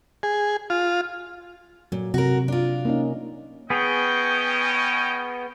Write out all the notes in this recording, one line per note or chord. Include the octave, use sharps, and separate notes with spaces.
G#4
F4
A#2 F#3
C3 F#4 A#4
D4 F4
A#3 C#4 D#4
B3 C#4 G#4 D#5 G5